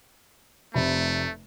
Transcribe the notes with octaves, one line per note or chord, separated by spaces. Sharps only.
F1 C3 A3 B5